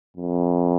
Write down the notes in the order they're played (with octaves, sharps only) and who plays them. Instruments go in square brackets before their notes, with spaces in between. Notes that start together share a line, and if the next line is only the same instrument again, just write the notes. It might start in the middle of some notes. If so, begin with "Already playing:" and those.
[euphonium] F2